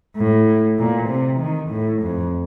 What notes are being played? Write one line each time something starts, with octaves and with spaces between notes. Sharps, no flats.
A2
A#2
C3
D#3
A2
F2